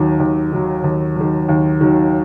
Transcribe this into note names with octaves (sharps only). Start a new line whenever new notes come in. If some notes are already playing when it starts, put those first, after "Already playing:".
Already playing: D#2 D#3 F#3
D#2
D#3 F#3
D#2
D#3 F#3
D#2
D#3 F#3